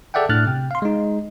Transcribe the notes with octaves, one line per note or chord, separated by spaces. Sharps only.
G#4 A4 D5 E5 F#5 G5
A2 D4 F6 F#6 A6
C3 G5
F5 C6
G#3 D#4